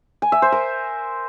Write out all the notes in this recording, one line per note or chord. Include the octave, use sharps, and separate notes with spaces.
G#5
E5
C5
A#4